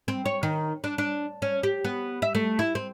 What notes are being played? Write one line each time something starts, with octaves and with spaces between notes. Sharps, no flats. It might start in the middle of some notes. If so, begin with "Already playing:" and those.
C4
C#5
D#3
D4
D4
C#4
G4
B3
E5
A3
E4
C4